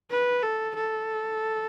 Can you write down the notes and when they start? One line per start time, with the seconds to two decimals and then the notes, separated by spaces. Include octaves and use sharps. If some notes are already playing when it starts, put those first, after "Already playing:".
0.10 B4
0.43 A4
0.75 A4